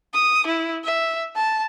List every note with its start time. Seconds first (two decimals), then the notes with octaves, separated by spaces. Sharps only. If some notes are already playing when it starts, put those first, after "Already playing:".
0.14 D#6
0.47 E4
0.84 E5
1.36 A5